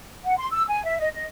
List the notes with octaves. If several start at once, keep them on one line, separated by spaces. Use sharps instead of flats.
F#5
C6
E6
G#5
E5
D#5
D#5